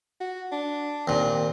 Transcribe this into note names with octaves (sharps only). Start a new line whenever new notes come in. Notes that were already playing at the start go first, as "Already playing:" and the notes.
F#4
D4
D#2 A#2 C4